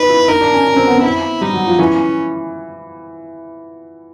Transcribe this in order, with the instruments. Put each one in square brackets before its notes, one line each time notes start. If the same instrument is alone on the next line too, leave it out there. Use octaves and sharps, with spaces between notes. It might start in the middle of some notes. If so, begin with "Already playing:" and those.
Already playing: [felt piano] D#4 [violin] B4
[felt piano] E4
[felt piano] D#4 [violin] A#4
[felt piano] D4
C#4
C#4
C4
B3
C4
[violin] E4
[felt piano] G3 [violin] D#4
[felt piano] F#3
F3
[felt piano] E3 [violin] C#4